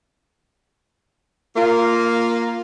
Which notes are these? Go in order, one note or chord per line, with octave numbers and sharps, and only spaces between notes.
A#3 F4